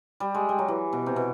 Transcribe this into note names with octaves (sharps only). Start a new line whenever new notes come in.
G3
G#3
G3
F#3
E3
B2
C3
B2